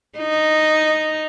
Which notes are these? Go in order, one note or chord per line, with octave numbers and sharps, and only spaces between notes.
D#4